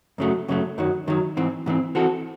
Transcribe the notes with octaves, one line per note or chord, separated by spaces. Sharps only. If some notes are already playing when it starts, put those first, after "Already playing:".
F#2 C#3 F#3 A3
F#2 C#3 F#3 A3
F#2 D#3 F#3
F#2 D#3 F#3
G#2 E3 C4
G#2 E3 C4
E3 C4 F#4 A4